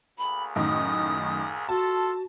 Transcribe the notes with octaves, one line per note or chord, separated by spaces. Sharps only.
D2 A#3 G#4 B5
F#2 A2 D#3 D#6
F4 F#4 A4 A5